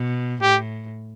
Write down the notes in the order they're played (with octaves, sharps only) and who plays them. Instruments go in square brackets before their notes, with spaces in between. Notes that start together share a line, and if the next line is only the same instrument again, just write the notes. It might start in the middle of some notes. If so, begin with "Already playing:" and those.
Already playing: [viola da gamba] B2
[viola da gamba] A2 [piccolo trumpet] G4